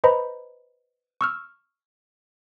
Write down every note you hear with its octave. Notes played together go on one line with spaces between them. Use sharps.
B4 C5 D#5 A#5 B5
C#6 E6 F6